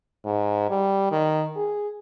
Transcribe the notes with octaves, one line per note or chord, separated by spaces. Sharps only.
G#2
G3
D#3
G#4